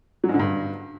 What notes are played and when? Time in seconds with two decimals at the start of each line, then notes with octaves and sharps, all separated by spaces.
0.24 F#3
0.29 G#2
0.34 D3
0.39 G2